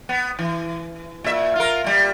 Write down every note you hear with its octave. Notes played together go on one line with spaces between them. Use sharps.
B3
E3
A#2 E5
F4 A#4
A#2 G3